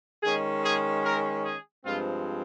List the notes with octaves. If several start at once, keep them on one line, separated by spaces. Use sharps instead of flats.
D#3 G#3 C#4 G#4
G#4
A#4
G#4
G2 F3 G#3 C4 F4